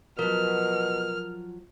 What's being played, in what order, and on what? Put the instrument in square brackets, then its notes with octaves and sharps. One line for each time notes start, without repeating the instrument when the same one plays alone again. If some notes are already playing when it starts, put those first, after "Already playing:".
[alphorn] B2 [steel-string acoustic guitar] F3 F#3 [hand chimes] A#4 [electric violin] F6